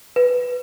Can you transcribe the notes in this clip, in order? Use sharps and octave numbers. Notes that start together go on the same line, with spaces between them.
B4